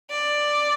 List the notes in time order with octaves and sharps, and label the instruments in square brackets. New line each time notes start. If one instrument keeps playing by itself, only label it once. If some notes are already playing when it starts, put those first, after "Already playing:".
[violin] D5